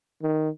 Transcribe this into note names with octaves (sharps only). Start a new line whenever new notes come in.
D#3